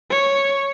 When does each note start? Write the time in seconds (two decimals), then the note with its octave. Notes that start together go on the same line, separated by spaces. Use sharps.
0.10 C#5